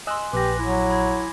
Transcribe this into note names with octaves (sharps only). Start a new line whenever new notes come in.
D#5 G#5 C6 E6 F#6
A#1 G4 B4 D6 A#6
F#3 E4
B5 G#6